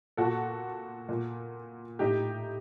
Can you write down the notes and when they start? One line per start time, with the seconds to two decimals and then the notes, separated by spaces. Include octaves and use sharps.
0.17 A#2 F#4 A4
1.09 A#2
1.99 A2 D#4 G4